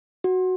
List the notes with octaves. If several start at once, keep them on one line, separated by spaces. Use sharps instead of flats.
F#4